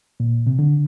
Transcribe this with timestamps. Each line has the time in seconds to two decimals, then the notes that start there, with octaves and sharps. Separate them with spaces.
0.20 A#2
0.47 C3
0.59 D3